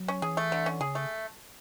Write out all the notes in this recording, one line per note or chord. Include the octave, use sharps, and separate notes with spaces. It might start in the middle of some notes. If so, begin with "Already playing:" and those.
Already playing: F#3
C#4
E3 G#4
A3
D3
C#4
C#3 G#4
A3